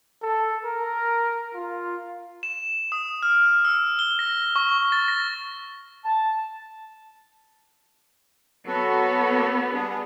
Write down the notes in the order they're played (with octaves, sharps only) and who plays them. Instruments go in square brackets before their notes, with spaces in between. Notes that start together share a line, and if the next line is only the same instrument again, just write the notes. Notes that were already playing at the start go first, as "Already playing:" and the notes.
[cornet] A4
A#4
F4
[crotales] E7
D#6
F6
E6
G7
A#6
C#6
A6
A#6
[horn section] A5
[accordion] F#3 F#4 A4 [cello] B3
[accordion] G3 D4 G#4